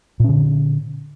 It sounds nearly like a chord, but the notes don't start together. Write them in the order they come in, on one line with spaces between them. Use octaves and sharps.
A#2 C#4 D3